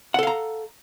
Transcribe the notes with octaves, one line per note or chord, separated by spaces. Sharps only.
A4 F5 F#5 A#5